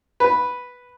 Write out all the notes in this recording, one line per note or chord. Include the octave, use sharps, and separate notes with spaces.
B4